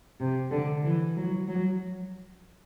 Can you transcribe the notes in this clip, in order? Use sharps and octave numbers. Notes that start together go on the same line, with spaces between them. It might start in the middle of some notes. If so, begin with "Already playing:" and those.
C3
D3
E3
F#3
F#3